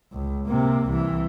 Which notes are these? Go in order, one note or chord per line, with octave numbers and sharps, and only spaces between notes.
C#2
C3 A#3
C2 E3